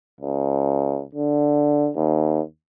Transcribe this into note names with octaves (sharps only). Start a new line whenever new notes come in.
C#2
D3
D#2